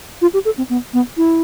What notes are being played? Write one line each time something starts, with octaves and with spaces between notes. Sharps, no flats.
F4
G4
A4
C4
B3
B3
E4